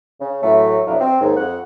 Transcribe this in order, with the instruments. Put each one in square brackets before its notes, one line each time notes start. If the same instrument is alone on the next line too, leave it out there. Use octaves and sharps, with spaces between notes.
[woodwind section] C#3
A2 E3 F#3 A3
F2 B2 F#3 D4 E4 F4
C4
D#2 G#2
F2 F#5